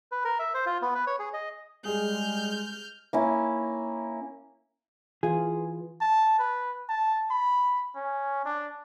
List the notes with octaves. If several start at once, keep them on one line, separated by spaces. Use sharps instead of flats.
B4
A#4
E5
C5
F4
B3
B4
C#5
G#4
D#5
G3 G#3 G#4 F6 G6
A#3 C#4 E4
E3 F4 G#4
A5
B4
A5
B5
C#4
D4